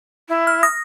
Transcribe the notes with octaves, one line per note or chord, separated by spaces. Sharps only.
E4
F6
D#6 A#6